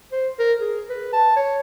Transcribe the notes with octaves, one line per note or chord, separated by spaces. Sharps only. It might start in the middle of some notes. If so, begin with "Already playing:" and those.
C5
A#4
G#4
B4
A5
C#5